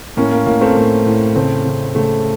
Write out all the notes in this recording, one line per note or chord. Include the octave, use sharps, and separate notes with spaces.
A2 A#3 C#4
A#3
A2 A#3
A3 C4
A2 A#3
A2
C#3 A3 C4
C#3
C#3 A3